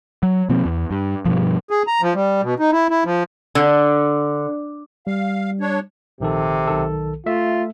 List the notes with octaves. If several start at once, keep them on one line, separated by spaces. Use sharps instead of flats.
F#3
B2 F3 A#3 C4
E2
G2
G2 B2 F3
G#4
A#5
F3
G3
B2
D#4
E4
E4
F3
D3
G3 F5
D4 C#5
A#1 C3 D#3 A4
B1 D#3 A4
A3 F4 E5